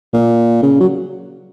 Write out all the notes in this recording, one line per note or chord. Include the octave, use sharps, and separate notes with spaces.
A#2
C#3
F#3